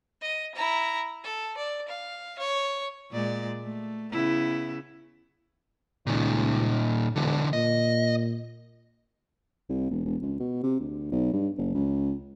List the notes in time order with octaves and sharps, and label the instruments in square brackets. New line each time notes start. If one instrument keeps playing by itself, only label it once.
[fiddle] D#5
E4 A#5
A4
D5
F5
C#5
[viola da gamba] A#2 G#3 D5
A3
C#3 B3 E4
[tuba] C#2 [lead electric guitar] A#2 D#3
[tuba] E1 [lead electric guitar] D3 E3
[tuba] A#2 [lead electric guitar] D#5
[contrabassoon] C2
E1
E1
C#2
B2
C3
D2
B1
G2
F#1
C#2